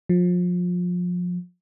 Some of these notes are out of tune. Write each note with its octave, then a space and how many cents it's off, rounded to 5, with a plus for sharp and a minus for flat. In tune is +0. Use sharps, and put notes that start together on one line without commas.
F3 +30